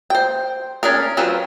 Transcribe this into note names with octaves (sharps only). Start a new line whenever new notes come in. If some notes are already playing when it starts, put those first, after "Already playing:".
C5 G5
C#4 D4 G#4 A#4
F#3 C4 F4 B4